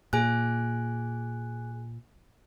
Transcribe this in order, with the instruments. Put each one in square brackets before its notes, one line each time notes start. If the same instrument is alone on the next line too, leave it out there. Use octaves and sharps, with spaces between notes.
[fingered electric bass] A#2 [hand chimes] G#4 G#5 F#6